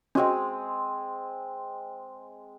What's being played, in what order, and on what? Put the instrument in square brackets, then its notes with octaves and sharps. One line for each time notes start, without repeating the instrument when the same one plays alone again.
[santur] G#3 C4 [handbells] C#4 F#4 D#5